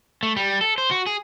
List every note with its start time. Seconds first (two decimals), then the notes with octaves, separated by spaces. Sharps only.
0.23 A3
0.36 G3
0.61 A4
0.78 C5
0.91 F#4
1.07 G#4